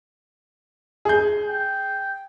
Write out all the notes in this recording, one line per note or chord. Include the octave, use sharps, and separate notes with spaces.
G#4 G6
G5